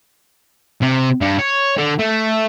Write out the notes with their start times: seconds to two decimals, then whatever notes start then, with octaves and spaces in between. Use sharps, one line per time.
0.82 C3
1.21 G2
1.39 C#5
1.78 D3
1.99 A3